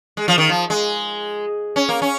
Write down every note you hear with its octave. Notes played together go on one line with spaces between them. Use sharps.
G#3
F3
D#3
F3
G#3
C#4
A#3
C#4